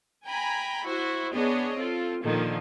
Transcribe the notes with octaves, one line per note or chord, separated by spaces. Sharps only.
G5 G#5 A#5 B5
E4 F#4 C5
B3 D4 G#4 C#5 D#5
C4 F4 A4
A#2 D3 D#3 F3 A#3